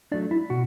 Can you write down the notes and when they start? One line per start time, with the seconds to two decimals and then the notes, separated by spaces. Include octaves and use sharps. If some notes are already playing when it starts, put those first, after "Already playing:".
0.12 F#3 A3 D4 D5
0.31 E4
0.50 B2 F#4